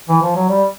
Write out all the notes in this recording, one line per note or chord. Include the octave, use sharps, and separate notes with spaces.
E3
F3
F#3
G3